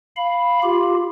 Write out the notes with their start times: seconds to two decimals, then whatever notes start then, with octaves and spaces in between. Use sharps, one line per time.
0.16 F5 B5
0.63 F4 G4